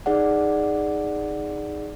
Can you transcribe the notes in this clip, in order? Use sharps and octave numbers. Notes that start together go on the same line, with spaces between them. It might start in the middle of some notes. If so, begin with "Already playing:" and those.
D#4 G#4 D5 F#5